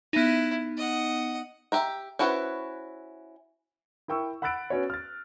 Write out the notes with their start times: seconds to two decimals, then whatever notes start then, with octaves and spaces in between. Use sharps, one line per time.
0.13 B3 D#4 E4
0.77 D#5 F#5
1.72 G4 E5 A#5
2.19 C#4 E4 F#4 B4 C5
4.08 E4 A#4 G5 C#6 E6
4.42 F#5 B5 E6 F#6 A6 D7
4.70 B3 C#4 F#4 C#5
4.90 F6 A6